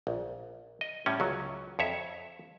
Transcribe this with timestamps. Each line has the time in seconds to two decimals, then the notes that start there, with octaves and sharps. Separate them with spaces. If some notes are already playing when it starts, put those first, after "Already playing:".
0.07 A#1
0.81 D#5
1.06 A2 G3 C#4
1.20 C#2 F#3
1.79 F2 C#5 E5